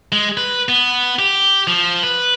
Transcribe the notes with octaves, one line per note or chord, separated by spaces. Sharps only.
G#3
B4
B3
G4
F3
B4